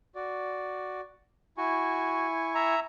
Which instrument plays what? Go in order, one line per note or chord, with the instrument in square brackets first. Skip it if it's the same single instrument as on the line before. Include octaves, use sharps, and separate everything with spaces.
[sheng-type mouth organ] F#4 D5
[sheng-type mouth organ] E4 G#5 C#6 [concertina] F#4
[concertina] E5 A#5